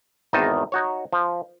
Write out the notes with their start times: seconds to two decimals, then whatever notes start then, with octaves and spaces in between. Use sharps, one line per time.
0.33 G#1 E2 D#3 D#4 D#5 A5
0.72 D#4 F#4 C#5
1.13 F3